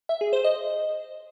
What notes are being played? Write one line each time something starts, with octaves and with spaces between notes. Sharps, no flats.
E5
G#4
C5
D#5